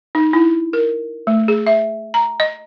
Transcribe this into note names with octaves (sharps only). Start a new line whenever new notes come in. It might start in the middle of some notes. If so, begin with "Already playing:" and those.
D#4
E4
A#4
A3
G#4
E5
A#5
D#5